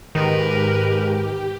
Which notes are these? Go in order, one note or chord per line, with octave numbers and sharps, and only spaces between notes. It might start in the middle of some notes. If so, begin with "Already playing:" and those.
G#2 D#3 G4 A#4 B4